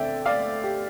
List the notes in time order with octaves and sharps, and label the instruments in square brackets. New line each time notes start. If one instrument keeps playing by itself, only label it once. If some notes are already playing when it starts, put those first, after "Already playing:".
Already playing: [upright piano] D2 D3 A3 C4 D5 E5 G5
D5 F5
G4